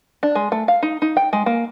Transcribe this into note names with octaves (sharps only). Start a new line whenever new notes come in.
D4
G#3
A3
F5
D#4
D#4
G5
G#3
A#3